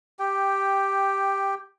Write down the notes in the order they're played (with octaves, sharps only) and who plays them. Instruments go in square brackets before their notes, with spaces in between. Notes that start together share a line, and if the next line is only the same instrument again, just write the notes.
[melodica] G4 G5